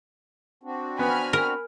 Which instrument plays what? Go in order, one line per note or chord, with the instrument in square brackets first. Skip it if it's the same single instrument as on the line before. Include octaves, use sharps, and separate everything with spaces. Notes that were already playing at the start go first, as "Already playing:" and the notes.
[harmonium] C4 D4 F#4
[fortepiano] B3 [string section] G#5 B5 F6
[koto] A#4